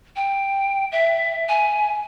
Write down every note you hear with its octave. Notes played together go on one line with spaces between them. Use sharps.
G5
E5
G#5